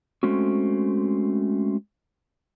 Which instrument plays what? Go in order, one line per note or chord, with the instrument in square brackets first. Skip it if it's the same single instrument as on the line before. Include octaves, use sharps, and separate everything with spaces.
[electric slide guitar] G#3 A3 C4 C#4 F#4